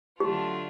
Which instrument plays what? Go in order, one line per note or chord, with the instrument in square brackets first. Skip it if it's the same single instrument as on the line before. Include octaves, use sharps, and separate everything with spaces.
[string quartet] D3 F#3 A3 D4 F4 [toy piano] G4